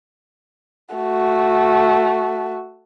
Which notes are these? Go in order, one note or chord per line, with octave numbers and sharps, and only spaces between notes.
A3 F#4